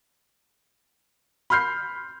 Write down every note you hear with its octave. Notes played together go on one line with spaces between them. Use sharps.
B5 C6 F6 G6 C7